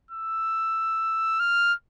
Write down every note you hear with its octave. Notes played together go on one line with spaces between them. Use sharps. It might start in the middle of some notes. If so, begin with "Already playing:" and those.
E6
F6